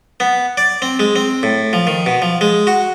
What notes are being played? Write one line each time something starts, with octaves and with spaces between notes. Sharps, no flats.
B3
D5
C4
G#3
C4
A2
F3
D#3
B2
F3
G#3
F#4